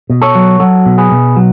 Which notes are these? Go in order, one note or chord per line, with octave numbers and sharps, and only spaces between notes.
B2
A4 C#5
F#3
F#3 F#4 A4
B2
G#4 B4
B2
F#3